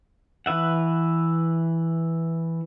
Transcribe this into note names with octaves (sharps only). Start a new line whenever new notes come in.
E3 B4 E5 F#5